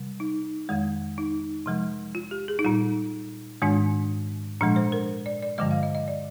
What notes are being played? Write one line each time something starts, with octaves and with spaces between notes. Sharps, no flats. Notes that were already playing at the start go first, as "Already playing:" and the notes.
Already playing: C3 G3
D#4
F2 D#3 G#3
D#4
C3 F3 G#3
F4
G4
G#4
D#4
A#2 G3 F4
G#2 D#3 G#3 D4
A#2 F3 G#3 D4
C5
A#4
D5
D5
G2 D3 F3 G#3 D#5
F5
D#5
D#5
D5